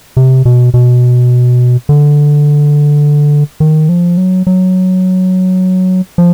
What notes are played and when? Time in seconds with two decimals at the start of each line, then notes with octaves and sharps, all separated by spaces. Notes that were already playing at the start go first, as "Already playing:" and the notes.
0.17 C3
0.45 B2
0.74 B2
1.89 D3
3.60 D#3
3.89 F3
4.17 F#3
4.47 F#3
6.18 F3